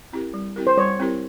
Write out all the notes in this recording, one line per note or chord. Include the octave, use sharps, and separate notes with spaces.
C4 E4 G4 A#4
G3
C4 E4 G4 A#4
C5
G3 C#5
C4 E4 G4 A#4